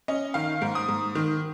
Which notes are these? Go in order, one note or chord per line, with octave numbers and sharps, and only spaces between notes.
C#4 D#5
D#3 F5
G#2
D#6
G#2
D#3